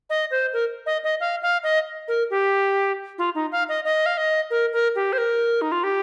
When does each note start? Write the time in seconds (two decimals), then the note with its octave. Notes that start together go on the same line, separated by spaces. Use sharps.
0.10 D#5
0.31 C5
0.53 A#4
0.86 D#5
1.04 D#5
1.20 F5
1.42 F5
1.63 D#5
2.08 A#4
2.30 G4
3.18 F4
3.35 D#4
3.52 F5
3.69 D#5
3.85 D#5
4.06 F5
4.17 D#5
4.51 A#4
4.73 A#4
4.95 G4
5.13 C5
5.18 A#4
5.62 D#4
5.72 F4
5.84 G4